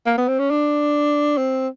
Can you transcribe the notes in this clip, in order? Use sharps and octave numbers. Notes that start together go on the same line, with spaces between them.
A#3
B3
C4
C#4
D4
C4